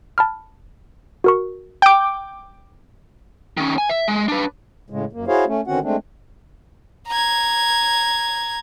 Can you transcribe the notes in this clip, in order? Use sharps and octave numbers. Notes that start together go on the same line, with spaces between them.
A5 B5 F6
F#4 A#4 C#6
G5 D6
D#3 C#4
G#5
E5
G#3
D4 B4
A2 C#3 G#3
F#2 A#3
E4 F#4 G#4 C5 C#5 F5
A3 C#4
D3 D#3 C4 C#4 F#4 F#5
G#3 A3 C4 D4
A#5 G#6